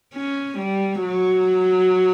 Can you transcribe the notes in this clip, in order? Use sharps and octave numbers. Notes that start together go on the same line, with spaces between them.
C#4
G3
F#3